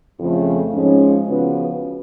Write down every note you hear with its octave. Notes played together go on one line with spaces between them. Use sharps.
F2 C#3 F3 A3
G#2 F3 G#3 C#4
C#3 F3 B3 F#4 B4